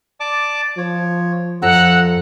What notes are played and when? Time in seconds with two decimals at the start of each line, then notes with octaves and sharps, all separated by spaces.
0.20 D5 A5 D6
0.78 F3 C#5
1.62 F2 F3 F#5 A#5 E6 F#6